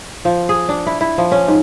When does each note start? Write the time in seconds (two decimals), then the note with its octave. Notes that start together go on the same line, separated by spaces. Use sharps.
0.25 F3
0.49 G#4
0.69 D4
0.86 E4
1.01 E4
1.18 F3
1.32 C#4
1.48 G#2